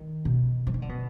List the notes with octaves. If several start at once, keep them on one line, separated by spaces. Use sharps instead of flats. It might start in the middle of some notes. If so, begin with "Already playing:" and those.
Already playing: D#3
B2
F3
D#3
D3
B2